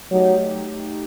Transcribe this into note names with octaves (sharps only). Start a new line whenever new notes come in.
F#3 A3 D#4 G4